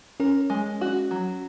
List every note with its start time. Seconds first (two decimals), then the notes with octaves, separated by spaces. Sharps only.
0.20 C#4 A#4
0.50 G#3
0.81 F#4
1.11 F#3